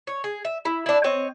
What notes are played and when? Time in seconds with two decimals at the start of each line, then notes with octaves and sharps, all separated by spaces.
0.07 C#5
0.24 G#4
0.45 E5
0.65 E4
0.86 D4 E4
1.04 C4 C#5 D#5